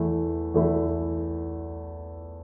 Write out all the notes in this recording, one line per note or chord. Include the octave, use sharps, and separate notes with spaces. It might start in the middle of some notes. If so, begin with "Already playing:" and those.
Already playing: E2 E3 A3 E4
E2 E3 A3 E4